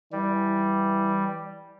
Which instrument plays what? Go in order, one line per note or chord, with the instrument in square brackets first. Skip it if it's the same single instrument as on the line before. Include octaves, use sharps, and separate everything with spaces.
[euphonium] E3 [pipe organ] G3